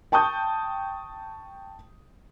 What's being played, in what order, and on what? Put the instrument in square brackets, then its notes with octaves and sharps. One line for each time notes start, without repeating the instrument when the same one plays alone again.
[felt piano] G5 A5 C#6 D#6 G6